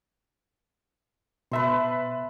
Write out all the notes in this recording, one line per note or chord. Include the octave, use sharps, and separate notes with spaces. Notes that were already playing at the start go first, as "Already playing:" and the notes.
B2 B4 E5 A5 C6